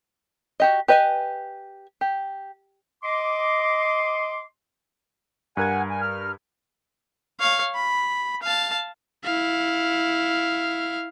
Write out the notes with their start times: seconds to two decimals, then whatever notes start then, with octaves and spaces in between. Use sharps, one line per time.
0.60 F#4 G4 D#5
0.88 G4 B4 D#5 G5 G#5
2.01 G4
3.03 D#5 C6 D6
5.57 G2 A#4 F#5 G#5 G#6
5.90 G#5
6.02 F6
7.40 C#5 F5
7.75 B5
8.43 F5 A5
9.24 E4 F5